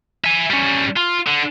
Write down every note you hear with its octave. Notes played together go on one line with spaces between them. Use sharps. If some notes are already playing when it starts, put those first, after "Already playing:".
E5 G#5
G3 C#4
F4
D3